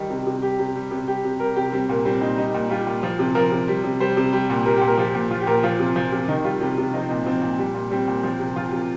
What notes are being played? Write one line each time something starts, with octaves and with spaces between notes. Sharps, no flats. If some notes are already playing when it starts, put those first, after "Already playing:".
Already playing: D#3 G3 D#4
C3
C3
G3 G4
C3
G3
C3
G3 G4
C3
G3 A#4
C3 G4
G3 C4
A#2 A#3
G3 C4
A#2 D#4
G3 D#4
A#2
G3 F4
A#2
F3
C3
F3 A#4
C3
G3
C3
G3 C5
C3
G3
A#2
G3 A#4
G4
A#2
A#4
F3 G4
A#2
F3 F4
G4
A#2 A#4
F3 F4
C3
F3
C3
D#3 D#4
G3 F4
C3
C3
F3 D#4
C4
A#2 D#4
F3 C4
A#2
G3
A#2
G3 C4
A#2
F3 C4
C3
F3 F4
C3